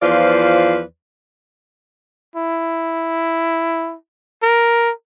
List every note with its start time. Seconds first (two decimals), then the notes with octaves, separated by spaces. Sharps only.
0.02 E2 F3 F4 B4 C5 D5
2.36 E4
4.43 A#4